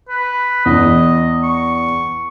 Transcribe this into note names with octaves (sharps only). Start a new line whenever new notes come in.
B4
E2 D#5
C#6